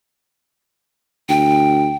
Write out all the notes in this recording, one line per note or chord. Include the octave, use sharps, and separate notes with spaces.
D2 G5